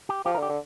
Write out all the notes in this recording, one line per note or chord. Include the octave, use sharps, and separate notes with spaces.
G4
F3 G4
A#4
D3
G4
D3